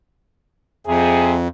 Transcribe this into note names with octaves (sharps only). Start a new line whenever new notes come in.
F2 C3 G#4